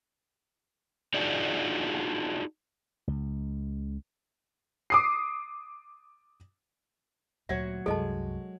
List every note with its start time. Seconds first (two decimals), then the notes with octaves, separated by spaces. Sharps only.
1.14 D4 D#4 F4 F#4 G#4 D5
3.08 C#2
4.90 D6 D#6 C7
7.49 D2 A#2 F#3 F#4 C#5 E5
7.86 C2 F#2 G#3 A4 D#5 A5